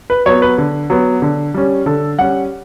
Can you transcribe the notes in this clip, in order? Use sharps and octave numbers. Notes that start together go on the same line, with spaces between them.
B4
F#3 B3 C#5
B4
D3
F#3 B3
D3
G3 C#4
D3 A4
G3 C#4 F#5